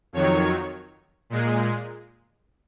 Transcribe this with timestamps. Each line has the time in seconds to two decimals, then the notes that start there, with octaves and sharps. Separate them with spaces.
0.13 F2 D#3 F#3 C#5
1.30 A#2 G#3